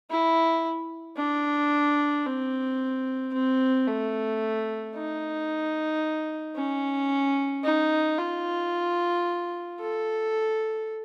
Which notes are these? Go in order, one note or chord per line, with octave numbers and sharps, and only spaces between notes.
E4
D4
C4
C4
A3
D#4
C#4
D#4
F4
A4